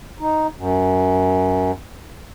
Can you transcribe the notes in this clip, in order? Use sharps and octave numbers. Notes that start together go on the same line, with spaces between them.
D#4
F#2